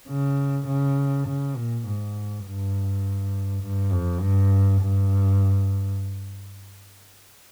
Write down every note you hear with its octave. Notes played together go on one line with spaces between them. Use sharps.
C#3
C#3
C#3
A#2
G#2
G2
G2
F2
G2
G2